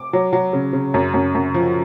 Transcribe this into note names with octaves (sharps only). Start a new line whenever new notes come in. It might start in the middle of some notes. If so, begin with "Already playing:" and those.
Already playing: D6
F#3
F#3
C#3
C#3
F#2
F#2
F#2
F3